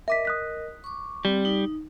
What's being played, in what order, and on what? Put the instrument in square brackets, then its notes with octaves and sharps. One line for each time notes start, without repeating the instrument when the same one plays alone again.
[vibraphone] A#4 D#5 [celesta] E5 D6 B6
[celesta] D#6 F#6 B6
[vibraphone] C#6 D6
[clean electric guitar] G3 [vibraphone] C4
[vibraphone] D#4